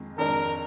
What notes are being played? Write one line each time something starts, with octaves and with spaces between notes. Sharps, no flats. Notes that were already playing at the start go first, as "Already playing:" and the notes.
Already playing: F2 D#3 G#3
F2 D#3 G#3 D4 A#4